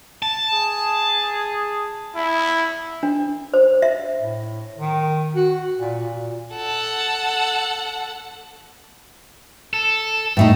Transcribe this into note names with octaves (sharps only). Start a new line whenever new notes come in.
A5
G#4
E4
D4
C5
E5
A2
D#3
F#4
A#2
A#2
A4 F#5
A4
A2 A3 D#4